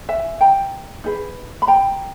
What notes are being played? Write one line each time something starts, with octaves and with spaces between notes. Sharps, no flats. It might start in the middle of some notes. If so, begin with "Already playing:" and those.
E5 G#5
G5 A#5
D#4 G#4 B4
B5
G5 A#5